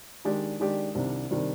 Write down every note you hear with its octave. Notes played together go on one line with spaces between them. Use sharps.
D#3 G#3 D4 G4 D5
D#3 G#3 D4 G4 D5
C2 C3 D#3 G3 D4
C3 D#3 G3 D4